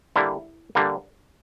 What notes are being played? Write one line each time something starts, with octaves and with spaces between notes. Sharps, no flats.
D3 G3 A#3 E4
D3 G3 A#3